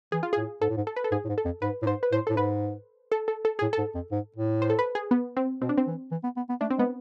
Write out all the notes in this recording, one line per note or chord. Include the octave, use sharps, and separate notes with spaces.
E3 G#4
F4
A2 G#4
G#2 A4
A2
G#2
A4
B4
A4
G#2 G#4
A2
G#2
A4
F2
G#2 B4
A2
G#2 C5
B4
A2 C5
A2 A4
G#2 B4
A4
A4
A4
A2 G#4
A4
G#2
F2
G#2
A2
C5
A4
B4
G#4
B3
C4
B2 C4
D4
C4
E3
E3
B3
B3
B3
A3 D4
C4
G#3 B3